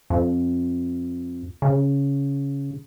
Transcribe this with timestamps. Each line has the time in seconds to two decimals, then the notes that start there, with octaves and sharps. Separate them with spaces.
0.10 F2
1.62 C#3